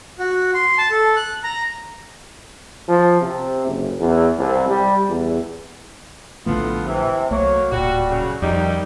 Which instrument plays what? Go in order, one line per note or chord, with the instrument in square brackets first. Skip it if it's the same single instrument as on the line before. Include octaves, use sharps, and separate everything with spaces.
[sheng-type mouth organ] F#4
C6
A5
A4
F#6
A#5
[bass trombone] F3
C3
F#1
E2
C2
G3
E2
[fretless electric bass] A#1 D3 A3 [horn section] A2 B3 F4
[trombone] C3 [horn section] E3
[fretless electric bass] C2 A3 [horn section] F#3 A#3 [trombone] C#5
[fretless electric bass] D1 G#1 A#2 [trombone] G3 [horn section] F#4
[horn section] C#3 F#3 F#4
[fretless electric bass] F2 [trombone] D#3 [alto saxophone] G3 [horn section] D#4